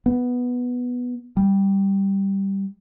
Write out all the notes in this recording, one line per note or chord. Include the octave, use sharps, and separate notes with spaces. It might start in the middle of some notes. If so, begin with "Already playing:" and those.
B3
G3